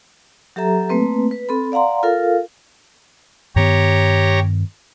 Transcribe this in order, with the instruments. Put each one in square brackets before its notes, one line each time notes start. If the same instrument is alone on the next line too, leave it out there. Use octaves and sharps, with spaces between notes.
[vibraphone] F#3 G4 A4 E5 A#5
A3 A#3 C4 B4
B4
C4 A4 B5
D5 F5 F#5 A#5 C6
F4 A4 A#4 F5
[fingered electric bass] G2 D#3 B3 [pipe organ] G4 C#5 A#5